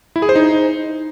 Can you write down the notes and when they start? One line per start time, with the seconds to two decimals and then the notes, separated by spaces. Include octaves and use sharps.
0.16 E4
0.22 G#4
0.29 C5
0.36 D#4